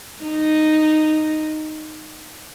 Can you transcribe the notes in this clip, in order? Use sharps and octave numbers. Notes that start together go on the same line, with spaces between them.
D#4